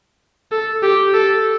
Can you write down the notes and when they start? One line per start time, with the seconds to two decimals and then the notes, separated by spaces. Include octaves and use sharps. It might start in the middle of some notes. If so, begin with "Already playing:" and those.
0.52 A4
0.83 G4
1.14 A4